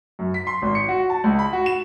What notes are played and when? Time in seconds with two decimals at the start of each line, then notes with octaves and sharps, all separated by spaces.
0.19 F#2
0.34 B6
0.47 C6
0.62 G#1
0.75 C#7
0.88 F#4
1.10 A5
1.24 C#2
1.39 B5
1.53 F#4
1.66 E7